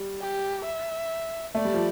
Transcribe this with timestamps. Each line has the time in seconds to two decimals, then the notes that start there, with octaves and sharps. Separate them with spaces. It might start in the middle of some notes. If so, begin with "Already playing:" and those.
Already playing: G3
0.21 G4
0.65 E5
1.55 A3 D5
1.65 G3
1.74 F3